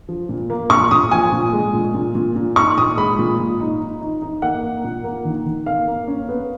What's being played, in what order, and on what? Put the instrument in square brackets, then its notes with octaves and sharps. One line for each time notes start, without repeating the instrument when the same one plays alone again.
[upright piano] F3
A#2
A#3
A#2 C#6
A#2 D#6
F3 G#5
A#2
G#3
A#2
A#2
A#2
A#2
D#4 C#6
A#2 D#6
G#3 B5
A#2
A#2
D#4
D#4
D#4
D#4
A#3 F#5
A#3
A#2
A#3
D#3
D#3
A#3 F5
A#3
C#4
B3